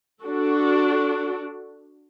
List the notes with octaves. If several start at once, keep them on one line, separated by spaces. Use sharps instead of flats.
D4 F#4 A4